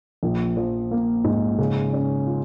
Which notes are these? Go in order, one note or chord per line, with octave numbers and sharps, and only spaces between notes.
A#1
F3
A#3
G#2
C#3
C#4
F4